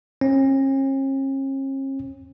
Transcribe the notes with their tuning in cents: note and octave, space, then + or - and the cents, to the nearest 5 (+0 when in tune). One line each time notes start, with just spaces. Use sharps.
C#4 -45